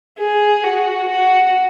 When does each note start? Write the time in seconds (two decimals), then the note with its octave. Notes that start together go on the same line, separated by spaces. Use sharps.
0.19 G#4
0.64 F#4
1.09 F#4